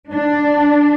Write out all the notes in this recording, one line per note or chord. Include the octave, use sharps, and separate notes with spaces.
D4